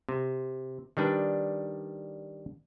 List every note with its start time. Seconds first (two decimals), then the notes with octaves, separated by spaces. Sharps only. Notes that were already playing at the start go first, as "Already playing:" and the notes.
0.09 C3
0.97 D#3 G3 D4 B4